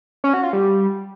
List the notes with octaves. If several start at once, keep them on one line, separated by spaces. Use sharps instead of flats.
C#4
F#4
F4
G3